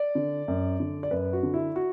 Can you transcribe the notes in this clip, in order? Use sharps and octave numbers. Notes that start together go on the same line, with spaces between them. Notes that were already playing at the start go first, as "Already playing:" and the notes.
Already playing: D5
D3
F#2
D3
D5
F#2 B4
F#4
D3
E4
F#4